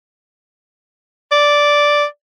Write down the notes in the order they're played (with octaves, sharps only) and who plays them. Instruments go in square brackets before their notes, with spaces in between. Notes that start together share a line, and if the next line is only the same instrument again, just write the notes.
[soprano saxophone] D5